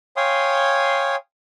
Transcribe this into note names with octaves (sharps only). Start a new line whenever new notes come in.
C#5 F5 G5 G#5 C6 D#6